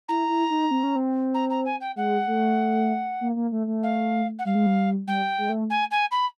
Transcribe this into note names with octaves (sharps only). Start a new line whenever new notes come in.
E4 A#5
E4
D#4
C4
C#4
C4
A#5
A#5
G#5
G5
G#3 F#5
A3
A#3
A#3
A3
A3
F5
F#5
G3 F5
G#3
G3
G3 G5
G#3
A3
G#5
G#5
B5